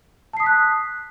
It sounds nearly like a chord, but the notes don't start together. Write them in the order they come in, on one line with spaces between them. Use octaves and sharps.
A5 C7 D#6 B6 F#6